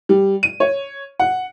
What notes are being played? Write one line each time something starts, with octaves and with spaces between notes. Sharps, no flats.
G3
D#7
C#5
F#5